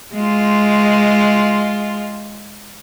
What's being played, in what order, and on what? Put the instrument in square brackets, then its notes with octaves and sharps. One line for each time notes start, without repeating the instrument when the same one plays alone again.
[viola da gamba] G#3 F4